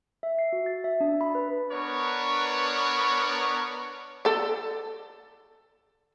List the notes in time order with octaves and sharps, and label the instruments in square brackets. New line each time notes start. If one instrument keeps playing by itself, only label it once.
[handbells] E5
C7
F#4
A6
E5
D4
B5
B4
[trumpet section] B3 D4 A#4 B4 C#5 C#6
[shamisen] A4 D5